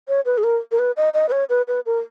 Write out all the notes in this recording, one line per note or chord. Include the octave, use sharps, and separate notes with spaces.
C#5
B4
G#4
A#4
A#4
B4
D#5
D#5
B4
C#5
B4
B4
A#4